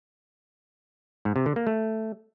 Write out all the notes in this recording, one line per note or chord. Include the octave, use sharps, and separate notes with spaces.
G#2
C3
D3
A#3
A3